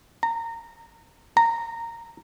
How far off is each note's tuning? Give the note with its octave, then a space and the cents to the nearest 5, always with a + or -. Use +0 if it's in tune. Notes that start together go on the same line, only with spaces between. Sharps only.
A#5 -25
A#5 -15